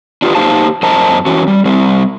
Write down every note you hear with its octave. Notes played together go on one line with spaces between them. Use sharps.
D4 F4 G4 B4
A#3 D#4 G4 C5 F5 A5
F#2 A#3 C5 D#5 A5 A#5
E3 C#4 F#4
G3
G3 C4